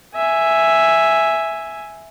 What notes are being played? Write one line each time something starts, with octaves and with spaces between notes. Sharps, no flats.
E5 G#5